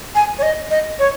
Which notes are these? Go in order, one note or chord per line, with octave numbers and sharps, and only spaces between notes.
G#5
C#5
D#5
D#5
C#5